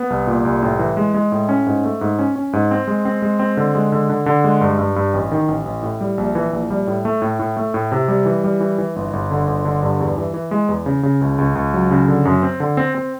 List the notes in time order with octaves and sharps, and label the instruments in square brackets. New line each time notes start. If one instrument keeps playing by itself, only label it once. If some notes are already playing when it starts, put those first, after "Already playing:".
Already playing: [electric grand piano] B3
C2
A#2
C2
A2
E3
G#3
G#3
A2
C#4
G#2
A3
G#2
C#4
C#4
G#2
C4
G#3
C4
G#3
C4
D3
G#3
D3
D3
D3
G#3
G2
G2
G2
A1
D#3
A1
A1
A2
G3
A#1
E3
A#1
G3
A2
A3
A2
A2
A3
A2
C3
G3
E3
G3
E3
E3
G1
G1
D3
G1
D3
G2
E2
E3
E3
G#3
E2
C#3
C#3
C#2
C#2
C#2
F#3
C#3
D3
F#2
C4
D3
C4
C4